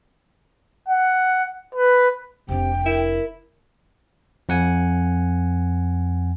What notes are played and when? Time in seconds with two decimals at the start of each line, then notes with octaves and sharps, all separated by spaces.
0.88 F#5
1.75 B4
2.49 F1 C3 D4 G5
2.86 E4 A#4
4.49 F2 F#5 G#5